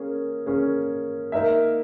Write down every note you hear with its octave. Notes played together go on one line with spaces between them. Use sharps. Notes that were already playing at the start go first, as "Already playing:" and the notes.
Already playing: A#3 C#4 G#4
A#3 C#4 G#4
A#3 D#4 A#4 E5